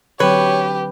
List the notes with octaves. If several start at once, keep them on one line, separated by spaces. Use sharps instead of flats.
D3 F#3 C4 G4 B4 C#5